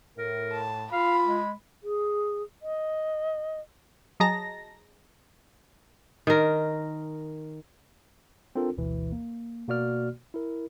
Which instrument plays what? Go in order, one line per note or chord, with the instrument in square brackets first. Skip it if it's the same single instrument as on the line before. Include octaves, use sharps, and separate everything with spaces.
[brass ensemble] A2 [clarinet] A#4
[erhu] A5
[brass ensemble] F4 [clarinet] F5 [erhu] B5
[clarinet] G#3
[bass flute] G#4
D#5
[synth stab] F#3 G#4 D#5 A5 A#5 A#6
[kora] D#3 A#4
[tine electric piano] C4 D4 F4 A4 A#4
G1 D2 B2 E3
A#3
B2 A#3 F#4 D5 F6
E4 A#4